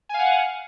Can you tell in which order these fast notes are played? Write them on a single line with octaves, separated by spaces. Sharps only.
G#5 F5 F#5